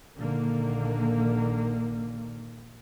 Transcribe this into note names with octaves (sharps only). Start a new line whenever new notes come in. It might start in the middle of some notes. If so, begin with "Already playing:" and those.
A#1 D3 D#3 A#3